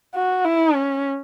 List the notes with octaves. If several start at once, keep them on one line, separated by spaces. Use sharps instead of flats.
F#4
E4
C#4